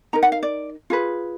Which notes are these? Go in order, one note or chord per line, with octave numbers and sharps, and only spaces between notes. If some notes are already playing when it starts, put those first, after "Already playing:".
D#4 A#4 A#5
F#5
F5
D5
F4 G#4 B4